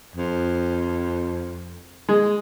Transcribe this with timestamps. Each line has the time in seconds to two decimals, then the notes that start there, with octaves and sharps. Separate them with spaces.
0.16 F2
2.09 G#3